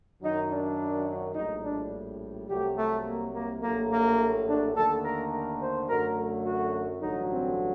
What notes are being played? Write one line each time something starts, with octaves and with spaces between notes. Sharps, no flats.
F#2 D#3 F#3 D#4
D4
A#1 A2 G3 D#4
D4
C2 C3 F#3 A3 G4
A3
A#3
A#3
A#1 A2 F#3 A3 A#3
A#3
D4
D#2 D3 A3 A4
A#4
A#4
C5
F#2 D3 F#3 A3 A#4
F#4
A1 G2 D3 F#3 D#4
C4